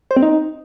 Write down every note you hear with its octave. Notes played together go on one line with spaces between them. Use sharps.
C5
C4
D#4